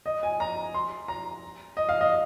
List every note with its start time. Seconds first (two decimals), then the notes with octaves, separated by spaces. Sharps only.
0.06 D#5
0.23 G#5
0.40 A#5
0.74 C6
1.08 A#5
1.77 D#5
1.89 F5
2.01 D#5